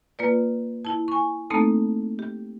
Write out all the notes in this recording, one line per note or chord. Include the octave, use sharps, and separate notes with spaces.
A#3 F4 B4 D5
E4 A5
G#5 C#6
A3 A#3 C4 D#4 A4 A5
G4